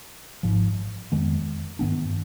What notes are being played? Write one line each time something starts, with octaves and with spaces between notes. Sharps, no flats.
G#1 G#2 F3
F2 D#3 G#3 B3
G2 D#3 B3 D4